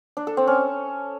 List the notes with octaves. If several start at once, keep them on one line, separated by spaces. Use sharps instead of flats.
D4
A4
C4
C#4